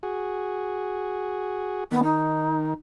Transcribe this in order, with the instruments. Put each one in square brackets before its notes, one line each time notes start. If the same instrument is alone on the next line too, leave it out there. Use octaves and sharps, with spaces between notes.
[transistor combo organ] F#4 G#4
[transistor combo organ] D#3 [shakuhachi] B3
[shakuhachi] D#4